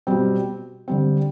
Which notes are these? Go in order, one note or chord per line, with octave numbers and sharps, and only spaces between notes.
B2 G3 C4
D3 G3 C4